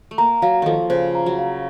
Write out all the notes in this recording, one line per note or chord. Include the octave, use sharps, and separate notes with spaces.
A3
A#3 A#5
F#3 F5
D#3 F3 A4
C#3 C5
A#5
F#3
F5